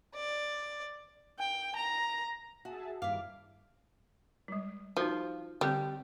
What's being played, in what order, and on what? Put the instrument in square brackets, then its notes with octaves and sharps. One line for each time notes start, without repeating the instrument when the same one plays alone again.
[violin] D5
[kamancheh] G5
A#5
[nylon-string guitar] F#4 [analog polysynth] G#4 E5 A5
[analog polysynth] G2 D#3 D6 [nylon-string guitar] E4 F5
[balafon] G3 G#3
[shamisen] F3 [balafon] D#4 F#4
[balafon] D3 C4 [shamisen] G3